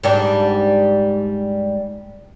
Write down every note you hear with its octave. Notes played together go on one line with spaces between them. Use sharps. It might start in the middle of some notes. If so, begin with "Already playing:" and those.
G#2 G3 D4